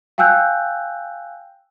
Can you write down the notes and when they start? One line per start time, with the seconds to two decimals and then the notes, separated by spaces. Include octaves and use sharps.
0.18 F5 G5 G#5 E6 F#6 G6